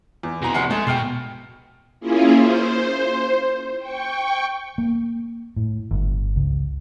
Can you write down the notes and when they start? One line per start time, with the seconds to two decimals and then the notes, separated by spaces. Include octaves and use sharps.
0.23 E2
0.42 C2 B2 G#3 A#5
0.54 F1 F#5 C7
0.71 G#3 A3
0.87 B2 G5 F6 C7
2.00 A#3 C#4 E4 F4 G#4
2.41 C5
3.79 G5 C#6
4.78 A#3
5.56 A2
5.91 G1
6.36 C#2